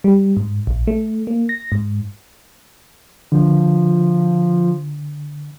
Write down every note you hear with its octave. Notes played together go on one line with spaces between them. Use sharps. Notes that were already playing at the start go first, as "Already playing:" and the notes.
G3
G#2
A#1
A3
A#3
A#6
G#2
D3 F3